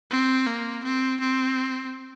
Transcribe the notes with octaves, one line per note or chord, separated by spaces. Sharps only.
C4
A#3
C4
C4